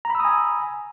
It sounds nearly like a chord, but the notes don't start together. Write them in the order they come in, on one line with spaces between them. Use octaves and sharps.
A#5 B5 E6 D#6 G#5